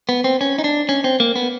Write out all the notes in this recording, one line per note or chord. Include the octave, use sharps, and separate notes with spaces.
B3
C4
C#4
D#4
D4
C#4
C4
A#3
B3